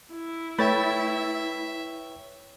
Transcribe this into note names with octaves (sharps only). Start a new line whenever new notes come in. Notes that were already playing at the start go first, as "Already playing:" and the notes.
E4
A3 B4 C#5 E5 G5 B5 A6